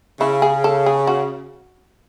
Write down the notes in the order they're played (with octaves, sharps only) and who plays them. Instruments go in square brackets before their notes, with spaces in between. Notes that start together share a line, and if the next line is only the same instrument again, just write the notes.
[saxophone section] C#3 [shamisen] E4
[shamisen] G#4
A4
G#4
F#4